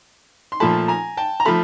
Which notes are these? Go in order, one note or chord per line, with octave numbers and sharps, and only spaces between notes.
C6
A#2 F3 A3 A5 B5
G#5 A#5
G5 A5
A#5
F3 A3 A5 B5